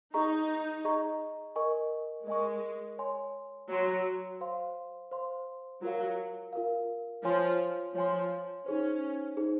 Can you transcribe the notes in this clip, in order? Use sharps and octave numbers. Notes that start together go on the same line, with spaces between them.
D#4 G#4 D#5 A#5 C#6
G#4 D#5 A#5 C#6
A#4 D#5 G#5 C#6
G#3 A#4 D#5 G#5 C#6
C#5 G#5 C6
F#3 C#5 G#5 C6
C5 F5 C6
C5 F5 C6
F#3 F4 A#4 F5
F4 A#4 F5
F3 C#5 G#5 C6
F3 C#5 G#5 C6
C#4 D#4 G#4 C5
D#4 G#4 C5